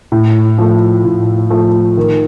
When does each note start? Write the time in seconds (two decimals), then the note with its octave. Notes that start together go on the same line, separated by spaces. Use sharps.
0.12 A2
0.58 F3 A3
1.05 A2
1.50 F3 A3
1.97 D#3